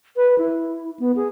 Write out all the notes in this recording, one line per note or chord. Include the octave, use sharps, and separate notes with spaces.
B4
E4
B3
G#4